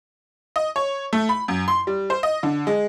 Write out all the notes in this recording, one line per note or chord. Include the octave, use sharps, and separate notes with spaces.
D#5
C#5
A3
B5
F#2
C6
G3
C5
D#5
D3
G#3